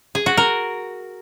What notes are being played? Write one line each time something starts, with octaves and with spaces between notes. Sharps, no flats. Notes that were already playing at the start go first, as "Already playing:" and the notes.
G#4
F#4
A#4